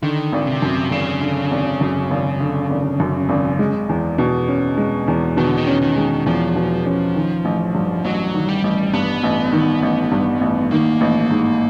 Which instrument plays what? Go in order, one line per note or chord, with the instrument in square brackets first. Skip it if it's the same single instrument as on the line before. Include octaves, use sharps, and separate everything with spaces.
[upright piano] D3 [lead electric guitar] D#3
[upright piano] G#1
[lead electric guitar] C3
[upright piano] F#2
[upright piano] G#1 [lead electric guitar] C#3
[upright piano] D3
G#1
F#2
G#1
D3
G#1
F#2
G#1
G#3
E2
B2
C#4
G#3
E2
[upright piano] B2 [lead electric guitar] D#3
[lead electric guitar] D3
D#3
[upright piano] C#4
[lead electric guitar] D#3
[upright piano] G#3
[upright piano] E2 [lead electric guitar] F3
[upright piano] B2
C#4
D#3
A1
G2
[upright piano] A1 [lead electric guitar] F#3
[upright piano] D#3
[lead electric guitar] G3
[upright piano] A1
[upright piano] G2 [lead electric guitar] B3
[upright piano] A1
D#3
A1
G2
A1
[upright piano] D#3 [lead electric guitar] A#3
[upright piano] A1
G#2